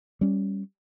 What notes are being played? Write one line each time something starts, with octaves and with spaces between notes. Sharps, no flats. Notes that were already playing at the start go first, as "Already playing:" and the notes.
G3 C#4